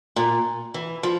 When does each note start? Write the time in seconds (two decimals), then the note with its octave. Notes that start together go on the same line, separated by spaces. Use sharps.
0.16 A#2
0.74 E3
1.03 F3